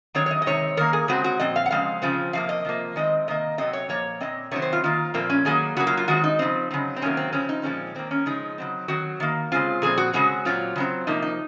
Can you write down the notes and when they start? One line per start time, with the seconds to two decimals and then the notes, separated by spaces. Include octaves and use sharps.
0.15 D#3 F#3 C4 C#5
0.26 C#5
0.31 D#5
0.42 D#5
0.46 C3 D#3 G#3 C4 C#5
0.77 D#3 A#3 A#4
0.93 G#4
1.08 C#3 G#3 C4 F#4
1.24 F#4
1.40 A#2 F3 C4 D#5
1.56 F5
1.66 F#5
1.71 C#3 F3 G#3 C4 F5
2.02 C#3 F3 C4
2.33 C3 F3 A#3 F5
2.49 D#5
2.65 C3 F3 A#3
2.96 D#3 G#3 C4 D#5
3.28 C3 D#3 A#3 D#5
3.58 C3 D#3 F#3 C4 D#5
3.73 C#5
3.89 A#2 F3 A#3 C#5
4.21 A#2 G#3 C4 D#5
4.51 C3 D#3 F#3 C4 C#5
4.62 C5
4.73 F4
4.84 D#3 A#3 F4
5.14 A#2 F3 A#3 C4
5.30 C#4
5.45 D#3 F#3 A#3 G#4
5.76 C#3 F#3 A#3 F#4
5.87 F4
5.97 F4
6.08 D#3 G#3 C4 F#4
6.24 D#4
6.39 C#3 F3 C4
6.71 C#3 F#3 C4
6.96 C4
7.02 C3 D#3 F#3 A#3 C#4
7.17 C4
7.32 C#3 F3 C4 C#4
7.49 D#4
7.63 A#2 F3 G#3 C4 C#4
7.95 D#3 A#3 C4
8.11 C#4
8.26 C#3 F3 G#3 D#4
8.58 C#3 F#3 C4
8.88 D#3 F#3 C4 F#4
9.20 D#3 A#3
9.52 C#3 G#3 C4 F4
9.82 A#2 F3 C4 G#4
9.98 F#4
10.13 C#3 G#3 C4 F#4
10.45 A#2 F#3 C4 F4
10.76 C#3 F#3 C4
11.07 C3 F3 A#3 D#4
11.22 D#4